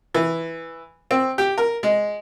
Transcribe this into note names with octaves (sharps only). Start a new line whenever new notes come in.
E3
C4
G4
A#4
G#3